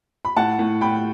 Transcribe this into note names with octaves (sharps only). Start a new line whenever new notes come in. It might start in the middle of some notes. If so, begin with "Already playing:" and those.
B5
A2 F#5 A5
A2
A2 G5 B5